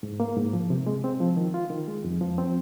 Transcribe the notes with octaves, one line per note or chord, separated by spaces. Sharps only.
G#2
A#3
G#2
F3
C3
G#3
C4
F3
D#3
F4
D#3
G#3
F2
F3
C4